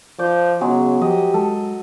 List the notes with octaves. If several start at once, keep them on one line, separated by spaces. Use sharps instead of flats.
F3 D5 G6
C#3 F#3 G#3 B3
F3 G4 D#5
G#3 A4